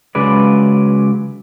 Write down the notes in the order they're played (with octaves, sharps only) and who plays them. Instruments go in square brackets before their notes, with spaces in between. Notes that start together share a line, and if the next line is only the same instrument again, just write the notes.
[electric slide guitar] C#3 F#3 G#3 B4 D5